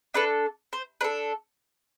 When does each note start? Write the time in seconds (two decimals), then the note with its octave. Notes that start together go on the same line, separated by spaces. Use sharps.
0.14 D4 A4 B4
0.73 C5
1.01 D4 A4 B4